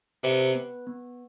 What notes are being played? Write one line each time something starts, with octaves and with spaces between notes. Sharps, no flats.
C3 B4
B3
B3